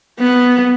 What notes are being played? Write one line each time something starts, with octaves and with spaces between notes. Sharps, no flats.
B3